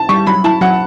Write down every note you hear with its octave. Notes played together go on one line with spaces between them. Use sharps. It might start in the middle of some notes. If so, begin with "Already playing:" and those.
Already playing: A5
G3 C#6
F#3 B5
E4 A5
F#3 F#5